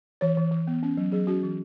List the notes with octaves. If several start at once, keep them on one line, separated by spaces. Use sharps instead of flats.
E3 C#5
E3
E3
B3
C#4
F#3
F#3 G#4
C#4 F#4
E3